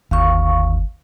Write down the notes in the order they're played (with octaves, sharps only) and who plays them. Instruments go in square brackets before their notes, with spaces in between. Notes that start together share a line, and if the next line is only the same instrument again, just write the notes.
[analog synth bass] G1 [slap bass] D#2 [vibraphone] F5 C#6